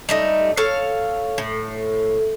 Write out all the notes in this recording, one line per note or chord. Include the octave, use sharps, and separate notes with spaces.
G3 A3 D#4
A4 C#5 F5
A2